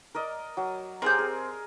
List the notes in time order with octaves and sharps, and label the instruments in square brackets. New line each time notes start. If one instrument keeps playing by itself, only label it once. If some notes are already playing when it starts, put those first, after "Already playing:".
[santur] A#4 D5 D#5
F#3
[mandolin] C4 G6 [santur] G4 G#4 A#4
[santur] G#4